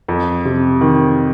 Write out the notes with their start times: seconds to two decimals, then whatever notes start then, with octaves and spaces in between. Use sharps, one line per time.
0.08 F2
0.45 C3
0.81 D#3